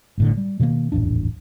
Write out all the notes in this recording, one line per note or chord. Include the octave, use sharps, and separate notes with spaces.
G1 A2 D3
G3
B2 D#3 F3 A#3
D#1 A1 F2 D4